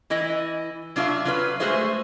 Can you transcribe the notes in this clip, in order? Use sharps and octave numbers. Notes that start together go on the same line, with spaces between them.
E3 E4 D#5
F#3 D4 F4 B4 E5 F5
F#3 F4 B4
G#3 A3 F#4 G#4 C5 E5